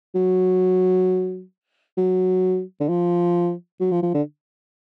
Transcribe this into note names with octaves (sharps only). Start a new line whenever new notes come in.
F#3
F#3
D3
F3
F#3
F3
F3
D3